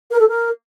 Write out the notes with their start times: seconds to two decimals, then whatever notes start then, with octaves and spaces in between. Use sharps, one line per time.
0.11 A#4
0.20 A4
0.28 A#4